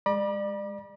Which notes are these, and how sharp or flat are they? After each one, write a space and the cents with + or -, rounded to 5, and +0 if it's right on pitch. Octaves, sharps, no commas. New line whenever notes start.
G#3 -20 D5 +30 B5 -40